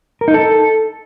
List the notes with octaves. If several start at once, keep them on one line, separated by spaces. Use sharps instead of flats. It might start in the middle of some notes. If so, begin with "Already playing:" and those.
A#4
D#4
A4